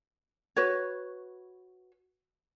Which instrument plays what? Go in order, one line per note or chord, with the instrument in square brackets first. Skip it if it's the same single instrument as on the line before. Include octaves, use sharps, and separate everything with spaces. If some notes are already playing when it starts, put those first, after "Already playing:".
[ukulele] F#4 B4 C#5